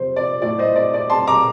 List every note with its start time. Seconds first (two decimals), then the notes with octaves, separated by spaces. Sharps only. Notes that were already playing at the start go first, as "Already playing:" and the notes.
Already playing: F2 C3 C5
0.16 D5
0.42 A2 D5
0.58 C5 D#5
0.76 D5
0.94 D5
1.10 A5 C6
1.27 A#5 D6